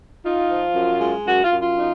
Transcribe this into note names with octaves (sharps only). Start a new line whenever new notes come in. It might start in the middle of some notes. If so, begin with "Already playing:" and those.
D#4 F4
F3
F#2
G#3
F#2 F#4
F4
F#2
F4
D#4